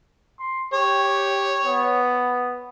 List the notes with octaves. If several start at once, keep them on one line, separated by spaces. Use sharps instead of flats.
C6
G4 C#5
B3